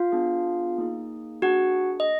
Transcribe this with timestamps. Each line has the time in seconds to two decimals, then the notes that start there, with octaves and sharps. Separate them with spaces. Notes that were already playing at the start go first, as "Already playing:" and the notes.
Already playing: F4 F5
0.12 B3 D4 G#4
0.78 A#3 D#4 G#4
1.42 A#3 D4 F#4 G#4 F#5
2.00 D#5